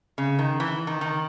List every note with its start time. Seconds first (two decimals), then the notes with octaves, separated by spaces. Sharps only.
0.18 C#3
0.39 D#3
0.60 E3
0.87 D#3
1.01 D#3